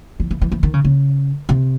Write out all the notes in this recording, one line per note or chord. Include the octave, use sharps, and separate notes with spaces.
E3
E3
E3
E3
D#3
C#3
C#3
C3